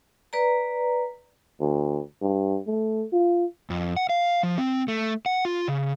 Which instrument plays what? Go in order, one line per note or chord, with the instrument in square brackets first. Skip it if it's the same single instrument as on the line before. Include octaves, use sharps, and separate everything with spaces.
[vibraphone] B4 D5 A#5
[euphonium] D2
G2
A3
F4
[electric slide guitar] F2
F#5
F5
F3
C4
A3
F#5
F4
C#3